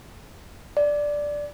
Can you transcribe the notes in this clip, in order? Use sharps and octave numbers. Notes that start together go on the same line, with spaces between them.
D5